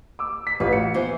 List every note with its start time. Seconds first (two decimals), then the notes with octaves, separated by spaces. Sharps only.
0.19 D6 E6
0.47 B6
0.60 A1 F4 B4
0.72 F#4 C#7
0.94 E3 B3 C5